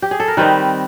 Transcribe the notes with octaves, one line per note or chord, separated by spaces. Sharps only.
G4
G#4
A4
A#4
D#3 G3 C4 D#4 B4